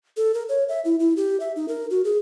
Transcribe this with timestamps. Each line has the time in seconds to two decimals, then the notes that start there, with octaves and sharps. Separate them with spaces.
0.17 A4
0.34 A#4
0.49 C#5
0.69 E5
0.85 E4
1.00 E4
1.17 G4
1.40 E5
1.56 D#4
1.68 A#4
1.90 F#4
2.05 G#4